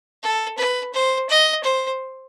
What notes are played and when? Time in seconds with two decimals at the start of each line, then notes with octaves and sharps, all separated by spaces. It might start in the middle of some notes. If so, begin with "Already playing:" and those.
0.23 A4
0.58 B4
0.93 C5
1.29 D#5
1.64 C5